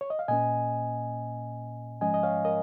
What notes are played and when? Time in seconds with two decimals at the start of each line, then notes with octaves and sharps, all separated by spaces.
0.01 C#5
0.10 D#5
0.19 F5
0.28 A#2 A#3 C#4 D#5 G#5
2.01 G#2 F3 G#3 C#4 D#5 G#5
2.14 D#5
2.23 C#5 F5
2.45 A#4 D#5